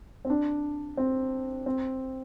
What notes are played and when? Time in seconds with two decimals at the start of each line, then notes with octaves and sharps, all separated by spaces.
0.25 C4
0.30 D4
0.97 C4
1.66 C4